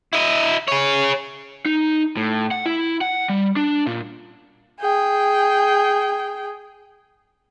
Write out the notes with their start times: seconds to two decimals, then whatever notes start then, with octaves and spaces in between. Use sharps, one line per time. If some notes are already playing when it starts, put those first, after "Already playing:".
0.13 E4 D#5
0.68 G#4 C#5
1.65 D#4
2.17 A2
2.51 F#5
2.66 E4
3.01 F#5
3.29 G3
3.56 D4
3.87 A#2
4.80 G#4 G5